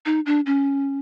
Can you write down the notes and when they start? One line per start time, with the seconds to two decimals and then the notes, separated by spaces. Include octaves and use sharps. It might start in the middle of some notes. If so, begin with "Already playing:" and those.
0.06 D#4
0.26 D4
0.46 C#4